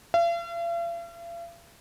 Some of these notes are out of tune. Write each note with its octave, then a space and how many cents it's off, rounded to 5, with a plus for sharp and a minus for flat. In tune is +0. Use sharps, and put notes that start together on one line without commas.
F5 -45